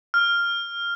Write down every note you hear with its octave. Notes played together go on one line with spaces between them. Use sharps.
F6